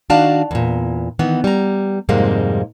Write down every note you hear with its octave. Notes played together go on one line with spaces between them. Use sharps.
D#3 D4 F#4 D5 F5 A5
E2 A#2
D#3 E3 B3
G3 A#5
F2 G#2 C3 G3 G#3 A#3